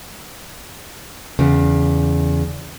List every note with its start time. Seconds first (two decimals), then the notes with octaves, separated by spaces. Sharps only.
1.39 E2 C#3